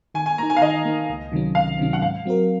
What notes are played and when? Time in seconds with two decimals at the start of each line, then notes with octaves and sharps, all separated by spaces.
0.14 D#3 G#5
0.26 G#5
0.38 A#3 D#4 A#5
0.50 G#5
0.57 F5
0.61 D#3 D#5
0.85 A#3 D#4
1.09 C#2
1.32 C3 D#3 F#3 C#4
1.55 C#2 F5
1.78 C3 D#3 F#3 C#4
1.93 F#5
2.02 G#2 F5
2.26 F#3 C4 F#4 A#4